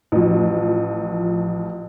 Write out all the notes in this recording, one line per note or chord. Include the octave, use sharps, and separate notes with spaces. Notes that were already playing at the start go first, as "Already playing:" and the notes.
A1 F3